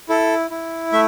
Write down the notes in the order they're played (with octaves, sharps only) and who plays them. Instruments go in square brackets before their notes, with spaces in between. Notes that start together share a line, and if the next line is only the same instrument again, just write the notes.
[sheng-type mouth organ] E4 A4
E4
A3 E5